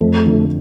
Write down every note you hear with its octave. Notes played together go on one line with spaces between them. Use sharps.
F2 A3
D3 F3